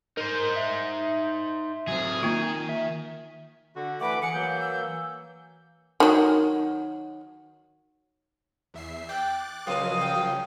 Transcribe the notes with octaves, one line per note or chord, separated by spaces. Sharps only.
D#4 A#4 C5
E5
F#3 C4 G#4
D#3 A#3 F4
E5
D3 F#4
E3 A3 B4 F#5 D6
E3 G#4 F#5 C#7
F#3 A#3 G6
E6
D#3 F#3
E2 E5 C7
G5 D6 F#6 A6
C#2 A#2 C#3 F3 F#3 C4 F5 D#6
G5